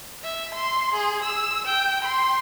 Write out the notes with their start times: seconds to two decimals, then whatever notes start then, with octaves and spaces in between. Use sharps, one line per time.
0.23 E5
0.54 C6
0.94 G#4
1.24 E6
1.65 G5
2.04 C6